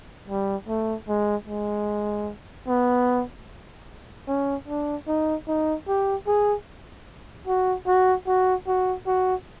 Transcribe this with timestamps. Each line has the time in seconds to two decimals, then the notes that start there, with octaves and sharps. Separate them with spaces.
0.28 G3
0.68 A3
1.08 G#3
1.48 G#3
2.68 B3
4.28 C#4
4.68 D4
5.08 D#4
5.47 D#4
5.88 G4
6.27 G#4
7.48 F#4
7.87 F#4
8.27 F#4
8.67 F#4
9.07 F#4